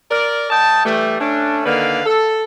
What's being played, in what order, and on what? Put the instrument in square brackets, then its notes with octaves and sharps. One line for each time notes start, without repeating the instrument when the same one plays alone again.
[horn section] A#4 D5
D#5 G5 A5
E3 G3 A3
A3 C#4 D4
D3 D#3 A#3 B4 F5
A4